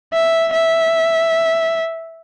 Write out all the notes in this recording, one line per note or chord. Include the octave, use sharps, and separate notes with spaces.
E5
E5